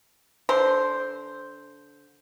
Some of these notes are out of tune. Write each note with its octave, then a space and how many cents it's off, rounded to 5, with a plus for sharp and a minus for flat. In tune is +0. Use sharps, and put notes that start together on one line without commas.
D3 -20 C5 +0